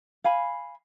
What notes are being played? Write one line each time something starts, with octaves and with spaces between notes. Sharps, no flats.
F5 G#5 B5